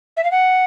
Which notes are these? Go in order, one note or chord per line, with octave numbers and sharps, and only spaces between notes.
E5
F5
F#5